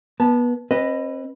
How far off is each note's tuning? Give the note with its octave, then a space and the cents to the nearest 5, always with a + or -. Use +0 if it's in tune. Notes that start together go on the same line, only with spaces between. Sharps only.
B3 -25 A5 -5
C4 +40 B4 +0 D#5 +0